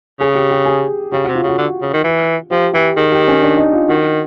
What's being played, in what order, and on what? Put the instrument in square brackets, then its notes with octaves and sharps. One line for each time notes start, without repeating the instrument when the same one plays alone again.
[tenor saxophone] C#3 [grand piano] G#4
[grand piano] G4
G4
G#4
[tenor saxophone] C#3 [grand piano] G4
[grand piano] F#4
[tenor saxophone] C3
[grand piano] F4
[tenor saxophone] C#3 [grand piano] F#4
[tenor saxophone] D3
C#3
D#3
E3
[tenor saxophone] F3 [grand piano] G4
[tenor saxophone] E3 [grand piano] G4
[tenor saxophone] D#3 [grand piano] G#4
[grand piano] G4
C#4
D4
D#4
F4
[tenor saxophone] D#3 [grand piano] F#4